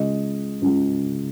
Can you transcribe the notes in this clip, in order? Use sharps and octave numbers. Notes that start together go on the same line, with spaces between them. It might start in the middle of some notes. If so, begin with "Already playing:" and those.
Already playing: C#2 C#3 G#3 D#5
C#2 C#3 G#3